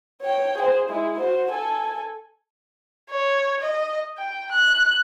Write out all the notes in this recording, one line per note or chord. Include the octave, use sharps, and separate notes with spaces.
C#5 G5
G#4 C5
G#3 E4
F#4 C5
A4 G#5
C#5
D#5
G5
F#6